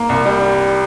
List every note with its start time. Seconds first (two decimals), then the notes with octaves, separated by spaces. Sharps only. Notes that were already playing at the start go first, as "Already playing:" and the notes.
Already playing: A#3
0.09 C2
0.25 G3